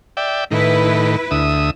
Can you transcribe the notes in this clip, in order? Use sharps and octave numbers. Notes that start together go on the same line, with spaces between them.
D5 E5 G5
A2 D#3 E4 B4
D2 E5 D#6